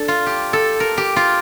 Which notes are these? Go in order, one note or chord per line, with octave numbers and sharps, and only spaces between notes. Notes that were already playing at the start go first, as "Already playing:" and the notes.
Already playing: D4 A4
F4
G4
A4
A#4
G4
F4